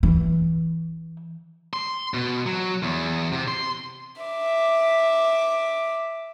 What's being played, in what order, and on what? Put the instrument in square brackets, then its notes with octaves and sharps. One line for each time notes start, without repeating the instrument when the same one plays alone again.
[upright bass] E3
[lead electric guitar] C6
B2
F#3
E2
C3
C6
[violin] E5 D6